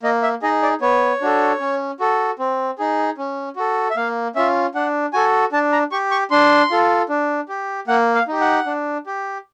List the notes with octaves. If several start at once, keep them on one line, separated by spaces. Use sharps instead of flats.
A#3 D#5
E5
D#4 G#4 D#5
D5
B3 C#5
D4 F#4 A4
C#4
F#4 A4
C4
D#4 G#4
C#4
F#4 A4
E5
A#3 F5
C#4 F4 E5
D4 F#5
F#4 A4 G#5
D4 A5
A#5
G4 C#6
C#6
D4 C6
F4 A4
D4
G4
A#3 F#5
F5
D#4 G4
F#5
D4
G4